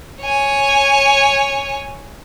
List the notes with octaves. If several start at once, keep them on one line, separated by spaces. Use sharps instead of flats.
C#5 G#5